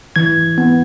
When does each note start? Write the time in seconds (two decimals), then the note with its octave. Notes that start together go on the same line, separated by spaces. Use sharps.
0.16 E3 G#6
0.58 B3